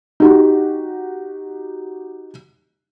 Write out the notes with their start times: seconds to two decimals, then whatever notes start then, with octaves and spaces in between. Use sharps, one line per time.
0.20 D#4 F#4 G4